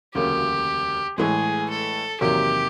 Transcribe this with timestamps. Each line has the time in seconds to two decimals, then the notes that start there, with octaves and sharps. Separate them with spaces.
0.14 E1 D2 C#3 F#3 A#3 G4
1.18 A2 E3 G#3 G#4
1.70 A4
2.20 E2 C3 D#3 F#3 A#3 G4